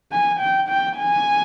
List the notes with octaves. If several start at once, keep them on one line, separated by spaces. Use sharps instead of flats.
G#5
G5
G5
G#5